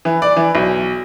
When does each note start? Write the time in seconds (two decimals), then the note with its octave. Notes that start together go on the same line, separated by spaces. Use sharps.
0.05 E3
0.22 D5
0.37 E3
0.55 B1